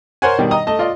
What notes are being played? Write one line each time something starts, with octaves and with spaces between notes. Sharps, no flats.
A#4 C5 C#5 F#5 G#5
B2 D#3 G3
D#5 A#5 D#6
A3 D#5 A5
F4 D5 D#5